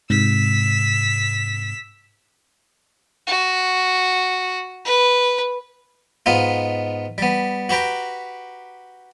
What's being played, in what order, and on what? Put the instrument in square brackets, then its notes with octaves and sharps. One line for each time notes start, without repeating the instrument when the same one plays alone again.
[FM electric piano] G#2 C3 [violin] E6 B6
[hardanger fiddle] F#4
B4
[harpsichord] G#2 B3 D#4 F4
G3 B3
F#4 G4 B4 G5 A#5